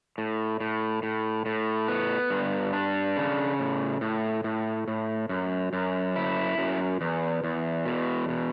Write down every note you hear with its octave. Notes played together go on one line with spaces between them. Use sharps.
A2
A2
A2
A2
B3
G2
D4
C#3
A2
A2
A2
A2
F#2
F#2
E4
F#2
E2
E2
B2
B2